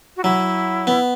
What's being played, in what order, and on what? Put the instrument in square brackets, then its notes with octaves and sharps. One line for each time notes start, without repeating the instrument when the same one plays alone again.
[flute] F#4
[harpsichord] F#3 [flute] E4
[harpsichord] B3